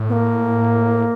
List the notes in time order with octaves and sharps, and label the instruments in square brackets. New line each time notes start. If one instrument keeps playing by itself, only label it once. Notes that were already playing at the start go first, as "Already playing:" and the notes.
Already playing: [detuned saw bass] A2
[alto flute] B3
A#3